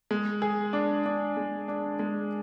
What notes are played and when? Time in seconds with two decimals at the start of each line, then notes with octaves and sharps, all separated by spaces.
0.11 G#3
0.42 G#4
0.73 D4
1.06 D4
1.37 G#3
1.68 D4
1.99 G#3